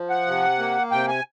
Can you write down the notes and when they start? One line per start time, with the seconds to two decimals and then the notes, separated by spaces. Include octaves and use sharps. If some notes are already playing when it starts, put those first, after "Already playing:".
Already playing: F3
0.10 F#5
0.27 C3
0.59 A#3
0.91 C3 G5
1.08 G#5